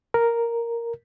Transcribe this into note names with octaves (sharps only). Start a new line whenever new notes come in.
A#4